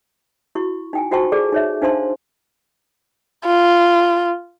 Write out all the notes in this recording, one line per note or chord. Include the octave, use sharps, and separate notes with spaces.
E4 F#4 C#6
D#4 G5 G#5
F4 F#4 C5 G5 A5 C#6
G#4 A4 D5 D6
D#4 C#5 E5
D4 D#4 C5 F5 A5 C6
F4